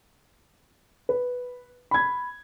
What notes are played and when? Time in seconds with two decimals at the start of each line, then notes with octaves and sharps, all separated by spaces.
1.09 B4
1.91 B5 G#6